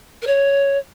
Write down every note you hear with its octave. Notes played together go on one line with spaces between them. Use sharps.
A#4
C#5